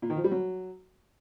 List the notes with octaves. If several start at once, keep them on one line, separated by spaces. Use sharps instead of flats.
A#2
D#3
F3
G3
F#3